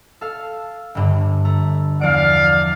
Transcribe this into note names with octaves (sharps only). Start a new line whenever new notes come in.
A4 F5
G1 G2 D3
A3 A#5
E2 F3 D5 F5 D7